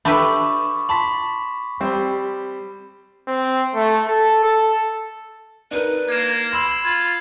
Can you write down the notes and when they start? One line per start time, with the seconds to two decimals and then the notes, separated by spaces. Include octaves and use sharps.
0.05 D4 G4 A4 B4 E5 B5 C#6 D6
0.89 A5 B5 C6 B6
1.80 G3 C4 C5
3.27 C4
3.74 A3
4.08 A4
4.44 A4
5.71 D4 D#4 A#4 B4
6.08 A#3 G#6 E7
6.52 B5 C6 E6 C7 E7 F#7
6.85 F4 G#6